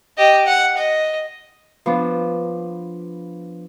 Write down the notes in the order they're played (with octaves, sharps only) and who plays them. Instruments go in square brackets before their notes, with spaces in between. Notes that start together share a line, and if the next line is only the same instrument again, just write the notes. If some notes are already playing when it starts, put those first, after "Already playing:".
[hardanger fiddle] G4 D#5
F#5
D#5
[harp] F3 B3 D4